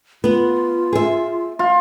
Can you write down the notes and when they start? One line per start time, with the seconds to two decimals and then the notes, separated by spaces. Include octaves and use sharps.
0.24 B3 F4 F#5
0.93 G#4 E5
1.59 F4